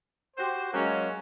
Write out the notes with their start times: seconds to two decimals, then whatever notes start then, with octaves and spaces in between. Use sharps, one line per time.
0.37 F#4 G4 C5
0.73 F#3 G#3 A#3 C#4